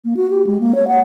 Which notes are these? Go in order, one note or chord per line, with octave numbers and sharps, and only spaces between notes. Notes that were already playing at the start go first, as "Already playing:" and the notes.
A#3
F#4
G4
G#3
A#3
C#5
F#5